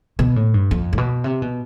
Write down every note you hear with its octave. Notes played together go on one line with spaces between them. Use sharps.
B2
A2
G2
F2
A2
B2
C3
B2